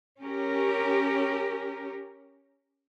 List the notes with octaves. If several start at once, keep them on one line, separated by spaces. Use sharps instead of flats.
C#4 G4 A#4